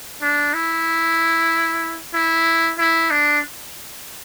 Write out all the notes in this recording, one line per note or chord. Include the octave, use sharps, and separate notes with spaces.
D4
E4
E4
E4
D4